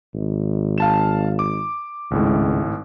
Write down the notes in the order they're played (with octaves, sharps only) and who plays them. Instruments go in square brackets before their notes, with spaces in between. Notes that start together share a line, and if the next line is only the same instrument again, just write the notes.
[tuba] G#1
[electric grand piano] F5 A5 E7
D6
[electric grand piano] G#1 A2 [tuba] C#2